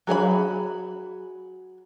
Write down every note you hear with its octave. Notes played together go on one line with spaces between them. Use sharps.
F#3 G#4 A#4 B5